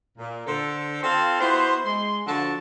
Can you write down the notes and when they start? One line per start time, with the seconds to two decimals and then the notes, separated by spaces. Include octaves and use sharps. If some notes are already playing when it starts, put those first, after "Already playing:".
0.18 A#2
0.47 D3 A4 C5
1.03 C4 F4 A4 F5 A5 C6
1.40 B3 E4 F#4 C5
1.85 G#3 C6
2.27 D3 F3 F#4 A5